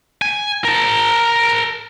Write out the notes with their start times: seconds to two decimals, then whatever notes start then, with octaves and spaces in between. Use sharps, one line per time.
0.22 G#5
0.65 A#4 A5